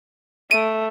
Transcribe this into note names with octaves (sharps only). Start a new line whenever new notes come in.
A3 D7 D#7